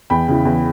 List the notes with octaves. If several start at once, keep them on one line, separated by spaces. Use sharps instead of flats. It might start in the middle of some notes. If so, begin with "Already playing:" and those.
E2 G5 B5
C#3 E3
E2